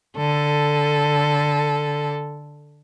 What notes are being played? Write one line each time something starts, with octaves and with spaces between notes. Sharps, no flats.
D3 A4